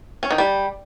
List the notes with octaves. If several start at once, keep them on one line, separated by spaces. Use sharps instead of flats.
C#4
D#3
G3